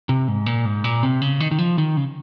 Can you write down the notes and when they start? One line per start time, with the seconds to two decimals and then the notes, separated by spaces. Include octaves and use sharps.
0.09 C3
0.28 G#2
0.46 A#2
0.65 G#2
0.84 A#2
1.03 C3
1.22 C#3
1.40 D#3
1.51 D#3
1.59 F3
1.78 D#3
1.97 C#3